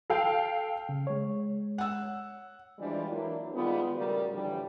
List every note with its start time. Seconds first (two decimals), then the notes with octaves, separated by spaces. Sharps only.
0.10 A4 F5 G5
0.89 C#3
1.07 G#3 C#5
1.78 F#5 E6
2.78 E3 F3 G3 G#3 D4 F4
3.09 E3 F#3 A#3 D4 E4
3.54 D#3 G3 G#3 B3 F4
3.94 A2 C#3 G3 F#4 A#4 D5
4.32 A2 D3 E3 F3 G3